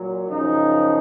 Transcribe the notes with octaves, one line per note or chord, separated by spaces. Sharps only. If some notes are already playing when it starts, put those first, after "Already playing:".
Already playing: A#2 F#3
F#2 C#3 F3 D#4